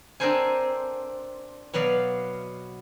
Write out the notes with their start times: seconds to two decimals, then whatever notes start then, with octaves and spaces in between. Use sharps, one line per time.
0.20 C4 D4 A4 A#4 C5 G#5
1.73 B2 F#3 B3 D5 F5